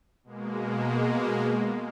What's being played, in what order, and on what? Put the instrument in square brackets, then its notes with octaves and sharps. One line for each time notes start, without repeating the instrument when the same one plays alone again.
[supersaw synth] B2 G#3 A#3